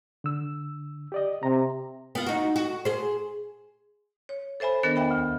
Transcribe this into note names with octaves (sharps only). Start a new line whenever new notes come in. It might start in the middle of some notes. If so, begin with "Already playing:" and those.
D3 E6
G4 D5 D#5
C3 A#5
B3 F4
D#4 F#4
F#4
G#4 C5
C#5
A4 C5 E5 G#5 B5
D#3 B3 D4 A#4 D#5 A6
E2 E5 G5 B5
D2